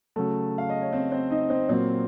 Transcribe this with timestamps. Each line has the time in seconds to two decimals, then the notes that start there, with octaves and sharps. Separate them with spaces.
0.16 C#3 F#3 A3 A4
0.58 F5
0.70 D#5
0.81 C#5
0.92 C4 C5
1.12 C4 C5
1.31 D#4 D#5
1.50 C4 C5
1.69 A#2 F#3 A#3 C4 C5